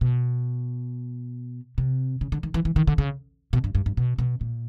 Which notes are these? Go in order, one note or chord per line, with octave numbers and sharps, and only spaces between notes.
B2
C3
C#3
D3
D#3
E3
E3
D#3
D3
C#3
B2
G2
G2
G2
B2
B2
A#2